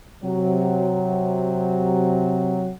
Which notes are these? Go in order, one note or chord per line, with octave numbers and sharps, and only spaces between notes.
C3 F#3